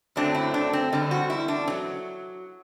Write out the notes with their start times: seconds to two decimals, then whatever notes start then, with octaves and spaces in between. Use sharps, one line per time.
0.16 F#2 D3 F#3 A3 C4 D4
0.35 E4
0.54 D4
0.73 C4
0.92 E2 D3 G3 C4
1.11 F#4
1.30 E4
1.48 D4
1.68 F#3 C4